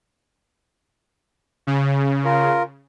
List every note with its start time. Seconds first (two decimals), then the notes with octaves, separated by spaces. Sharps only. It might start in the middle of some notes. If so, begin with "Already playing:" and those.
1.67 C#3
2.25 F4 A#4